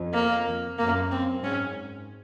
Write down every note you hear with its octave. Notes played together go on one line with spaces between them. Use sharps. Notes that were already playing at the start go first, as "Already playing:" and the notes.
Already playing: F2
A#3
F2
F#2 A#3
C4
G#2 C#4